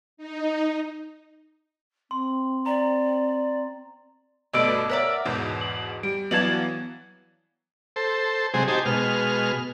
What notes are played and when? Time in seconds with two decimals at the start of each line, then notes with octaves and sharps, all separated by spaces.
0.17 D#4
2.11 C4 C6
2.66 D5 A#5
4.53 G1 B2 A3 B4 D5 D#5 E6 D7
4.90 A#4 B4 C#5 D5 E5 F#5 A#5
5.25 E2 G#2 B2 G6
5.61 F#7
6.03 G3 D7
6.31 E3 F#3 B3 D5 F5 A5 G#6 F#7
7.96 A4 C5
8.54 C3 F#3 G#3 G#4 C5
8.68 D#4 G4 C5 G#5 A5
8.86 B2 G#3 F6